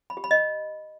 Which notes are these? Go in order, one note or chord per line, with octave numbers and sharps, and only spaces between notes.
B5
G4
B5
D#5